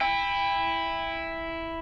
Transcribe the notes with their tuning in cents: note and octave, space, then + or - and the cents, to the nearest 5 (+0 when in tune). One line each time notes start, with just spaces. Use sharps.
E4 +0 G5 +35